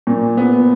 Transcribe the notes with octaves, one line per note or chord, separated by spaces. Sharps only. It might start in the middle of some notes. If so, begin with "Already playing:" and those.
A#2
B3